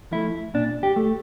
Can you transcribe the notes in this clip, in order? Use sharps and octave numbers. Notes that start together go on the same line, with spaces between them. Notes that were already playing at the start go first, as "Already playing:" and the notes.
F3 A3 E4
A#2 D4
G4
A3